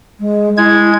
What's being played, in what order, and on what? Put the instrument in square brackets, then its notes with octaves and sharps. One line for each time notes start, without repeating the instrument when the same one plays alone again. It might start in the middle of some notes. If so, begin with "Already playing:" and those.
[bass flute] G#3
[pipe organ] G#3 G#6 [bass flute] E4